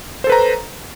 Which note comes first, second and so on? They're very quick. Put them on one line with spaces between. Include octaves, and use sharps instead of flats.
C5 A4 B4 A#5